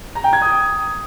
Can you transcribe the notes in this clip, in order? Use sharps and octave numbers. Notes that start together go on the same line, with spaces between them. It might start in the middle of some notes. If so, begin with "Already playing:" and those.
A#5
G5
G#6
D#6